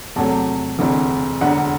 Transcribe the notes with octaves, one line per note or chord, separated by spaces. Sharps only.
E2 C3 F#3 A3 A5
E1 D2 C3 E3
E1 E2 D3 F#5